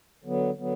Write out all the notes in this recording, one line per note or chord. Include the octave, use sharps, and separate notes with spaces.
D3 F#3 B3
D3 F#3 B3